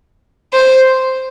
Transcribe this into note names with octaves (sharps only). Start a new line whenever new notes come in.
C5